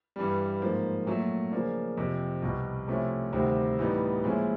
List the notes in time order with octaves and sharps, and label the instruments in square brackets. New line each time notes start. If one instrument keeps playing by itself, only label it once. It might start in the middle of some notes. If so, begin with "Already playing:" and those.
[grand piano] G2 E3 G3
G#2 F3 A#3
A#2 F#3 A3
C#3 F3 A#3 D4
F2 C3 F3
C2 B2 G3
C3 F3 A3 C#4 E4
D2 C3 D#3 G3 C4
A2 E3 G3 B3 D#4
A#2 F3 G#3 C#4 E4